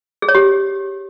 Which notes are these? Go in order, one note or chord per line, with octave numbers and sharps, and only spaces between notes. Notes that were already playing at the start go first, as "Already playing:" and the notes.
G#4
C#5
G4